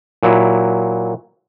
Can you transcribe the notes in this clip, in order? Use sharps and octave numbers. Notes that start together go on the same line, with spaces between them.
A#2 F#3 E4